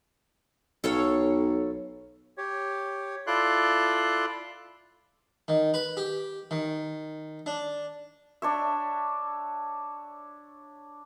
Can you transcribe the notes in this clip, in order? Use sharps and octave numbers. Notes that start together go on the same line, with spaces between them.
B1 A4 C#5 F5
G4 C#5
E4 F4 A4 D5 C6 F#6
D#3
B4
G4
D#3
D4
D4 C#5 E5